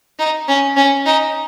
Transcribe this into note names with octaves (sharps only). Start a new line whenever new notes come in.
D#4
C#4
C#4
D#4